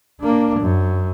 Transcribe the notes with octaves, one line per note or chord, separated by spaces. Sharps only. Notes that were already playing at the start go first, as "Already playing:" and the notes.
A#3 D4
F#2